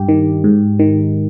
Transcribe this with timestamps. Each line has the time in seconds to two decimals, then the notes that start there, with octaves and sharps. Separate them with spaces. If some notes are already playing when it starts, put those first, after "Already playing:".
Already playing: G2 G4
0.09 D#3
0.44 G#2
0.79 D#3